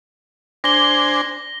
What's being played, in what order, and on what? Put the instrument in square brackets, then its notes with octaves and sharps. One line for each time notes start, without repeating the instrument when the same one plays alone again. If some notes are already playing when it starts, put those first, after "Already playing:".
[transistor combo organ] D4 C5 G#5 [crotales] A#6 G7